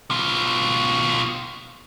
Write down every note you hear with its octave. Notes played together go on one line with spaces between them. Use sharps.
B2 F4